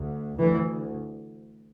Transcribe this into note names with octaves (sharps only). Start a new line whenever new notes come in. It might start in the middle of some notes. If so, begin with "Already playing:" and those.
Already playing: D2
D2 E3